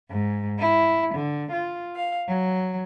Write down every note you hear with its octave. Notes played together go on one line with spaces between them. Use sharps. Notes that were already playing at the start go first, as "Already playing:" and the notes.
G#2
E4
D3
F4
F5
F#3